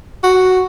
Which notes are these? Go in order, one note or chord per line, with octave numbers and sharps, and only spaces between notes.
F#4